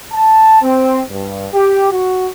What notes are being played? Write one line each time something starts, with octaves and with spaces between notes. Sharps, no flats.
A5
C4
G2
G4
F#4